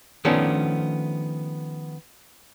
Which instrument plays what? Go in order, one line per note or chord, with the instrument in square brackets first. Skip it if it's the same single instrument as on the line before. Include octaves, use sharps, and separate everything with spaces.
[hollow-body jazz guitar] D#3 F3 A3 B3 C#4 D4